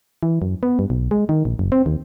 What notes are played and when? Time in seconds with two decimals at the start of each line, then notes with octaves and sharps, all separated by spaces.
0.23 E3
0.42 F#2
0.63 B3
0.79 G2
0.90 B1
1.11 G#3
1.29 D#3
1.45 A#1
1.59 F#1
1.72 C4
1.86 D#2